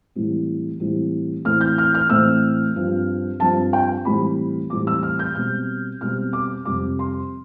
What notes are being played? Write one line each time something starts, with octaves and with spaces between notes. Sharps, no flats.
A2 E3 G3 C4
A2 E3 G3 C4
A2 E3 A3 C4 F6
G6
F6
F6
A2 E3 A3 C4 E6
G2 F3 C4
G2 F3 C4 A5
G5
A2 E3 G3 C4 B5
A2 E3 G3 C4 D6
E6
F6
G6
B2 G3 C4 F6
B2 G3 C4 F6
D6
F2 C3 G3 D6
C6